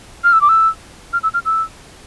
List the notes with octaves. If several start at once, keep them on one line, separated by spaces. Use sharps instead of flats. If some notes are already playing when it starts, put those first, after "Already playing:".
F6
E6
D6
E6
F6
E6
F6
E6